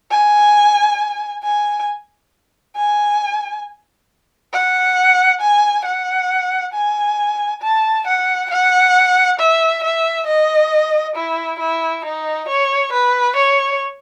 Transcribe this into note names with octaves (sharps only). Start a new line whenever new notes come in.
G#5
G#5
G#5
F#5
G#5
F#5
G#5
A5
F#5
F#5
E5
E5
D#5
E4
E4
D#4
C#5
B4
C#5